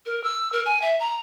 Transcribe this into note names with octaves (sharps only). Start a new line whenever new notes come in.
A#4
E6
A#4
G#5
E5
A#5